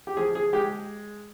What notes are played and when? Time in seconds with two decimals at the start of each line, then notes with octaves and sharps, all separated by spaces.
0.07 G4
0.17 F3 G#4
0.35 G#4
0.53 G#3 G4